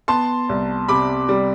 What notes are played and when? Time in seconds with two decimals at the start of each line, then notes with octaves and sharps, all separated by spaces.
0.08 B3 A5 C6
0.49 C2
0.88 C3 B5 D6
1.29 G3